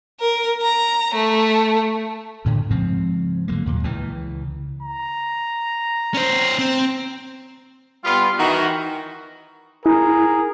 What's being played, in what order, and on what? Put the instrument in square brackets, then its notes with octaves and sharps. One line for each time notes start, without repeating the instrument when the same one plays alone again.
[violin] A#4
A#5
A3
[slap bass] D2 A2 D3
G#2 C#3 F3 C4
D3 F#3 G#3 A#3
D#2 A#2
C#2 C#3 E3
[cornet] A#5
[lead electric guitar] C#4 C5
C4
[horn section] G3 B3 F4
D#3 E3 F#4
[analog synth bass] E4 [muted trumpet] G#4 [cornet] A#4